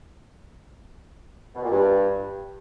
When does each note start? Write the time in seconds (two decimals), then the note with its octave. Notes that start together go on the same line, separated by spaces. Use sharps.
1.55 B2
1.63 A#2
1.71 G2